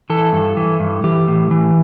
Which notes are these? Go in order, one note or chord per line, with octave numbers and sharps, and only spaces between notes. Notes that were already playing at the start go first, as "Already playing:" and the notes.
E3 A4
G2
E3
G2
E3 G4
A2
E3